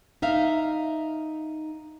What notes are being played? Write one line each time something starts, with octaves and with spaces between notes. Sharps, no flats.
D#4 E5 F5